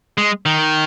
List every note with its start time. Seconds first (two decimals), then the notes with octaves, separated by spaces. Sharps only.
0.18 G#3
0.46 D#3